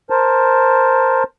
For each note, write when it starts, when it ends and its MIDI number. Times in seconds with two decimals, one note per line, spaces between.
0.10 1.23 70
0.10 1.23 72
0.10 1.23 81